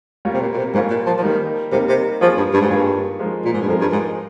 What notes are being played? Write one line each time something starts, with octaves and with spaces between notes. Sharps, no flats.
G3 A#3 F4 A#4 C#5
C3
A#2
A#2
C3
G#2 G3 A#3 F4 A#4 C#5
A#2
F3
F3
D#3 G3 A#3 D#4 A#4
C3 G3 A#3 D#4 A#4
C3
D#3 F3 A#3 F4 G#4 C#5
G2
G2
G#2
G2 D#3 A#3 F4 G#4 C#5
F3 G#3 D#4 A#4
A#2
G#2
G2
F2 F3 G#3 D#4 A#4
G2
G#2